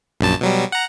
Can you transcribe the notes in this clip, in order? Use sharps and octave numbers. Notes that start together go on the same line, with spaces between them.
A#1 F#2 A5
B2 F#3 G3
F#5 A#5